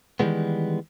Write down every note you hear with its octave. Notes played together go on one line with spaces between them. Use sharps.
D#3 E3 G3 G#3 B3